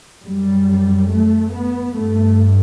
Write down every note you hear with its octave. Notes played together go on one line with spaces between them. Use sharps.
F#2 G3
A3
B3
G2 A3